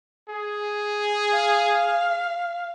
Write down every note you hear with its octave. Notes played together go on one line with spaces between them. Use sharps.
G#4
F5